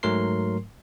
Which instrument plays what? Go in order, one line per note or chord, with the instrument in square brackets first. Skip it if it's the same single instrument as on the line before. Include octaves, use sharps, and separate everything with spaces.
[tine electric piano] G#2 F#3 A3 A#4 C6 C7